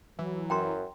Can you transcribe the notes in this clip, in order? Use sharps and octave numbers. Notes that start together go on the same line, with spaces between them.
E3 F#3
F#2 G5 A#5 C6